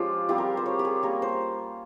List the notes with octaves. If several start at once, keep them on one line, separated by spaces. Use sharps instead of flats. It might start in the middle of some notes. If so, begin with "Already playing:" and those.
Already playing: F3 G#3 C#4 F4 G4
G3 C4 F4 G4
A#4
C5
C#5
G4
G#4
G3 A#3 C#4 A#4
C5